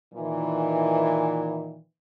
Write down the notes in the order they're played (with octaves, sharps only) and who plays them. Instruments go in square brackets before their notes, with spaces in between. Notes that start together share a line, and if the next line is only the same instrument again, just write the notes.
[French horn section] A#2 D#3 E3